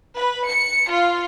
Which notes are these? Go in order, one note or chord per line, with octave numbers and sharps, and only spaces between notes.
B4
C#7
F4